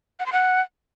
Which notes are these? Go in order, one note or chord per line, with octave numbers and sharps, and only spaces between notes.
F#5
C6
F#5